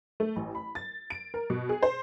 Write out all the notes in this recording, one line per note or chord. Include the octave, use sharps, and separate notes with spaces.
A3
A1
B5
A6
D7
A#4
B2
G#4
C5